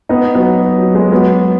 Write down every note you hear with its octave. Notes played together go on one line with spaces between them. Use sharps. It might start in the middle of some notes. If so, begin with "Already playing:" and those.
B3 D#4
F#3 B3
F#3
G#3
F#3 B3